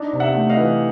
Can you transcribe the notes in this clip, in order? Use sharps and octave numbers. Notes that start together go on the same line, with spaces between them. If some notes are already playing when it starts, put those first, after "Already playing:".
Already playing: D4 D#4
C3
E5 F#5
A3
D#5 F5
E3